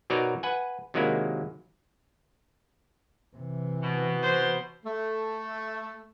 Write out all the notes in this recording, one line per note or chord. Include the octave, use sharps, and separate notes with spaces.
B2 F#3 D#4 A#4 D5 A#5
B4 F#5 G#5
C3 D#3 F#3 G#3 A#3 E4
C3 E3
B2
C5
A3